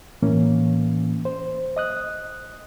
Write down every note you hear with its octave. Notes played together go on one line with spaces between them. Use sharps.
A2 E3 A#3 C#4
C5
D#5 D#6 F#6